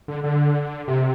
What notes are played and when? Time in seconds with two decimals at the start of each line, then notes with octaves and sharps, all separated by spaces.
0.08 D3
0.24 D3
0.88 C3